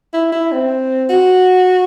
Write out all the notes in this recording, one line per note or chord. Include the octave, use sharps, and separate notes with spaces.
E4
E4
C4
F#4